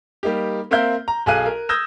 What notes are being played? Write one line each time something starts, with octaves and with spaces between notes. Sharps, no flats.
G3 A#3 D#4 G4
A#3 C4 A#4 E5 F5 G6
A#5
B1 G#4 A4 F5 F#6 D#7
A#4
D#6 E6 G6 G#6 A#6 E7